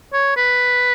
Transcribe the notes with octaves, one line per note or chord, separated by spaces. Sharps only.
C#5
B4